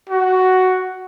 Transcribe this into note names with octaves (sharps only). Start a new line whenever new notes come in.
F#4